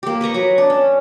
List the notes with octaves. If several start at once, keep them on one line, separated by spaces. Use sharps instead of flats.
A#3 G4
B4 D#5 A#5 C#6
F#3 C#6
D4
C#4